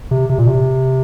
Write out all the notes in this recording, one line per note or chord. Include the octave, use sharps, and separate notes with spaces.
C3
C3
A#2
C3